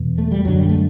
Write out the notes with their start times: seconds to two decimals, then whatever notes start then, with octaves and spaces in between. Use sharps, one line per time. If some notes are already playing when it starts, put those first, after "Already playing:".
Already playing: E2 B2
0.18 A3
0.32 G3
0.45 F#2 D3 F#3
0.59 G3
0.69 A3